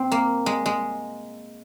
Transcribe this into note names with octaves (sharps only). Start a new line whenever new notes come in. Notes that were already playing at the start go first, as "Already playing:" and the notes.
Already playing: A#2 C4
A#3
G#3
G#3